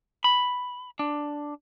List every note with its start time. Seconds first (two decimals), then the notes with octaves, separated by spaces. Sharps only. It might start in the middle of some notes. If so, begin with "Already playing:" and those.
0.24 B5
0.99 D4